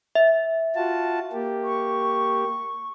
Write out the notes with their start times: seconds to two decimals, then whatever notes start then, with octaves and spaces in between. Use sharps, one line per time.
0.15 E5
0.76 F4 F#4 A5
1.33 A#3 G4
1.64 C#6